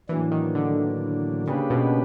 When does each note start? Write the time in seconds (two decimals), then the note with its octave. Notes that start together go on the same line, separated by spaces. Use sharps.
0.09 A2 E3 F#3 A#3 D4
0.32 D#3
0.55 D3
1.47 C#3 A#3 D4 G4 B4
1.70 B2